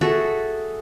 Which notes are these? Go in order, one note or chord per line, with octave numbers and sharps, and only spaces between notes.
F#4 G#4 A4 E5